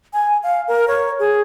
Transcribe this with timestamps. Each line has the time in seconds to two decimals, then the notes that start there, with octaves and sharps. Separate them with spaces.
0.13 G#5
0.43 F5
0.68 A#4
0.88 C#5
1.19 G#4